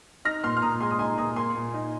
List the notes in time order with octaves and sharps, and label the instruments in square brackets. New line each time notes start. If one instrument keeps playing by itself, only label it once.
[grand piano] D#4 F6 A#6
A#2 C6 F6
F6
A#2 A#5 D#6
G#3 G#5 C6
D#6
D#4 G#5 C6
A#2 A#5 D#6
A#3 G#5 C6
A#2
D#4